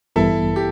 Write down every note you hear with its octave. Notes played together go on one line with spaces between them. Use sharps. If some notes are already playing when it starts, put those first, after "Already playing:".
A1 G2 E3 G3 B3 E4 A4
G4